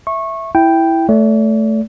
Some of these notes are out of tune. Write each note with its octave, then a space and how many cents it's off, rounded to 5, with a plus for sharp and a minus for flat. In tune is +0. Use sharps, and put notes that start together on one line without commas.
E5 +0 C#6 -20
E4 +0 G5 +0
A3 -5 D5 -40